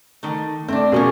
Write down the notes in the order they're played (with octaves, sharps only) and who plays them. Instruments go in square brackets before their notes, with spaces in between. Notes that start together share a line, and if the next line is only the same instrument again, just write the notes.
[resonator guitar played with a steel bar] D#3 A3
[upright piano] A3 [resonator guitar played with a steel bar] C4 D4
[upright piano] B2 A#3 G#4 [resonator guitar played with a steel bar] F3 C#4 F5